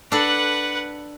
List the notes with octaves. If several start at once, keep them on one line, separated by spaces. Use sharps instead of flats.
D4 A4 B4 F#5